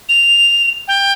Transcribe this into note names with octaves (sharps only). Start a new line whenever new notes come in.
F7
G5